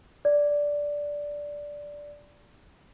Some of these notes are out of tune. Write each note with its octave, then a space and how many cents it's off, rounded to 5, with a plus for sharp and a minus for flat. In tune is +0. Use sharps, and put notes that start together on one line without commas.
D5 -5